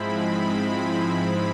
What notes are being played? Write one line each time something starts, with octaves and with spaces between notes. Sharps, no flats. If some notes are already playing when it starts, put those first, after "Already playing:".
Already playing: G#2 F3 G#3 C4 E4 B5